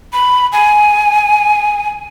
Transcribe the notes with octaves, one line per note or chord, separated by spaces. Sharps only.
B5
G#5